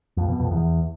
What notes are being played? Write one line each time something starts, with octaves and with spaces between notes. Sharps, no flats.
F2
B2
F2
E2